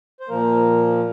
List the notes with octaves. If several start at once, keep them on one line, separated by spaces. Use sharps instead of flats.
C5
A#2 F3 A#3 A#4